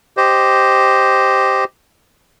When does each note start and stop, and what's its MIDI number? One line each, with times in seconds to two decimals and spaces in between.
0.17 1.64 67
0.17 1.64 72
0.17 1.64 75